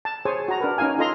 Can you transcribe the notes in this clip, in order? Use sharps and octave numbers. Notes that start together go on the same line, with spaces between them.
A5
G#4 C5 C#5 G#5
F#4 A#5
D4 A#4 B4
C#4 D#4 A#4 F5 G#5
D#4 F4 A4 D#5 A#5 C6